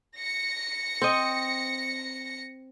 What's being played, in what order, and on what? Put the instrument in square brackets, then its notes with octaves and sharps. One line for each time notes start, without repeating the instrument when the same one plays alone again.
[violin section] A#6 C#7
[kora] C4 D#5